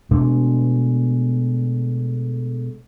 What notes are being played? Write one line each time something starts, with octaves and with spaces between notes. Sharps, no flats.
B2 G#3 A3 D4